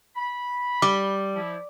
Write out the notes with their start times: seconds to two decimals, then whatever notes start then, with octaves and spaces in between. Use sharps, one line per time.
0.16 B5
0.82 G3 D6
1.35 F3 E4